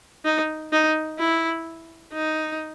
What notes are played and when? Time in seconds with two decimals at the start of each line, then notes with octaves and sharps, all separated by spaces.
0.25 D#4
0.72 D#4
1.19 E4
2.13 D#4